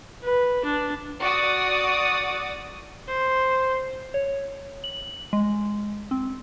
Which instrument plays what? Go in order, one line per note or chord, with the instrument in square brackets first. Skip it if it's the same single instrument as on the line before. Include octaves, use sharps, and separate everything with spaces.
[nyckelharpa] B4
D4
[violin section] F#4 D5 D#6
[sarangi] C5
[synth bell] C#5
F#7
G#3
C4